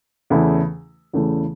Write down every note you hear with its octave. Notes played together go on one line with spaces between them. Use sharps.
E2 C#3 A3 E4
E2 C#3 A3 E4